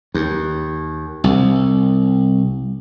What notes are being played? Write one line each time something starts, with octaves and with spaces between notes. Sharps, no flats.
D#2
C2